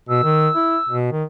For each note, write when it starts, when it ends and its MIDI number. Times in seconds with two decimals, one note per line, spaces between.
0.09 0.24 47
0.09 0.95 88
0.24 0.49 51
0.55 0.77 64
0.89 1.12 47
1.12 1.24 51